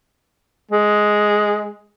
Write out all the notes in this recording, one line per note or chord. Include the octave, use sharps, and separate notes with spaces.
G#3